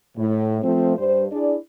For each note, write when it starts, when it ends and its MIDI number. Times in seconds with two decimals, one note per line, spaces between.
0.16 0.58 45
0.63 0.95 53
0.63 0.95 57
0.63 0.95 60
0.97 1.25 43
0.97 1.25 72
1.32 1.56 62
1.32 1.56 64
1.32 1.56 68
1.32 1.56 74